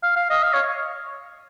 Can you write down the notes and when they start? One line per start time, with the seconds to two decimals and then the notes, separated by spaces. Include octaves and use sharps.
0.03 F5
0.16 F5
0.30 D#5
0.43 F5
0.53 C#5